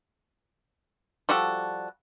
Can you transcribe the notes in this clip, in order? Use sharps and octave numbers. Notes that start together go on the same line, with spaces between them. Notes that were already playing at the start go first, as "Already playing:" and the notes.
F3 G3 F#4 A4